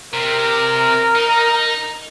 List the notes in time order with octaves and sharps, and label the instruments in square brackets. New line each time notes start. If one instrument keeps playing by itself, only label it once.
[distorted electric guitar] C3 [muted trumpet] A#4
[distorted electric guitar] D#4